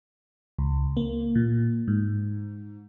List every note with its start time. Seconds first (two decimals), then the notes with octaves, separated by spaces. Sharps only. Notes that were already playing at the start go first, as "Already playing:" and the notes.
0.59 C#2
0.97 A#3
1.36 A#2
1.88 G#2